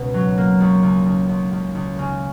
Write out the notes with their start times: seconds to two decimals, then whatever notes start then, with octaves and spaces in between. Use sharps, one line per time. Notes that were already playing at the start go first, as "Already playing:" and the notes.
Already playing: C#2 B2
0.14 F#3
0.38 A#3
0.60 C#2
0.83 C#2
1.06 C#2
1.29 C#2
1.52 C#2
1.75 C#2
1.98 C#3